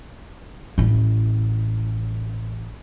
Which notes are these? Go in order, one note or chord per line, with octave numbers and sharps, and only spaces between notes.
A1 E4